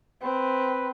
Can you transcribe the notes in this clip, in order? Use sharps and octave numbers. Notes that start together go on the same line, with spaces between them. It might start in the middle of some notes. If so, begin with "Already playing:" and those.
C4 B4